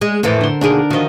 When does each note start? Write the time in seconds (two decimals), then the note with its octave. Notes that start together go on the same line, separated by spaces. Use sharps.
0.01 G#3
0.23 F2 A2 E3 A4 A#4 C5
0.41 D3 C6
0.61 D#2 B2 D4 G#4 A#4
0.90 D#3 F3 F#4 D#5